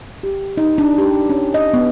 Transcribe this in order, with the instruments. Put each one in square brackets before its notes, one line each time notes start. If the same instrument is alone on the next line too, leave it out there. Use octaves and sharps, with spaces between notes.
[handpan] G4
D#4
D4
G4
C#4
D#5
B3